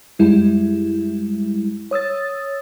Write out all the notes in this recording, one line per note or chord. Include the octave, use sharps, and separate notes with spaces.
F#2 G3 G#3 E4
C#5 D#6 E6 A6